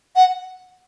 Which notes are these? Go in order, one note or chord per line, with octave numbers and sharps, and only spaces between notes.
F#5